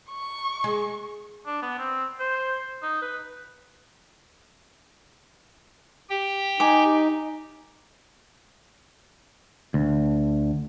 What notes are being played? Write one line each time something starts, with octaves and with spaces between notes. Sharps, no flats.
C#6
G#3
D4
B3
C4
C5
D#4
B4
G4 G5
D#4 G#5 D6
D2